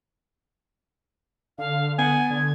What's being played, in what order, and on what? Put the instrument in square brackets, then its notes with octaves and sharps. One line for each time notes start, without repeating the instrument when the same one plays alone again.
[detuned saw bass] D3 [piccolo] F5
[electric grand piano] B3 [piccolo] F#5 [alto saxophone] G#5
[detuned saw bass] D3 [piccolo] G#6